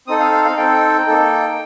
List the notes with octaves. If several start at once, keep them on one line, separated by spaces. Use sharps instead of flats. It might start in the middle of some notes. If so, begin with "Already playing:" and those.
C4 D#4 A4 D#6
F5
F5
F5
C4 D#4 A4 G5
A#3 D#4 A4